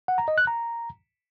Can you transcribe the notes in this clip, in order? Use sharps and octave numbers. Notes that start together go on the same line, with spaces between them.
F#5
A#5
D#5
F#6
A#5